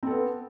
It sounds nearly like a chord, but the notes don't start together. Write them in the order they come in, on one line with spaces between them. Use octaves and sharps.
C4 A4 B3